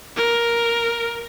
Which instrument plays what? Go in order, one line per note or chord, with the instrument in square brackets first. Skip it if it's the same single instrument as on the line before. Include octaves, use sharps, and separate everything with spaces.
[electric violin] A#4